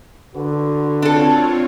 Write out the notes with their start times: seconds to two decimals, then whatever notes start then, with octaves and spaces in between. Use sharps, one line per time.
0.35 D3 F#4 B4
1.02 C4 D4 F4 A4 C#5